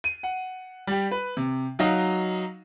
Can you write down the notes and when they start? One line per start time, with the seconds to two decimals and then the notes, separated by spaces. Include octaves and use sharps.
0.04 D#7
0.23 F#5
0.87 G3 G4
1.11 B4
1.37 C3
1.79 F#3 D#4 F#4 D#5 F5